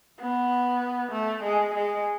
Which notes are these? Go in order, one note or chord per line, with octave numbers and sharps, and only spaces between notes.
B3
A3
G#3
G#3